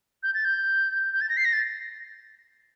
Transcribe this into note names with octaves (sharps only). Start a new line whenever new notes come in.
G6
A6
G6
G6
A6
A#6
C7
A#6
A6